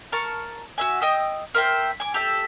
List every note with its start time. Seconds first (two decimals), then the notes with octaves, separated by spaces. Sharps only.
0.12 A#4 A5 C#6
0.78 F#4 E5 G#5
1.01 D#5 G5 D#6 E6
1.54 A#4 C5 E5 G5
2.00 G#5 D6
2.14 G4 A4 E5